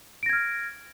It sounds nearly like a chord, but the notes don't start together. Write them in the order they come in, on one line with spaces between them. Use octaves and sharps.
D7 A#6 G#6 F6